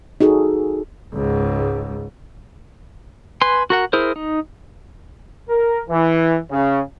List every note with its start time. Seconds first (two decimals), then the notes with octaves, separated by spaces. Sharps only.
0.20 D#4 F#4 G#4 A4
1.14 C#2 G#2
3.41 B4 G#5 C6
3.70 F#4 A#4 F#5
3.93 E4 G#4 A#4 C5
4.16 D#4
5.49 A#4
5.88 E3
6.51 C#3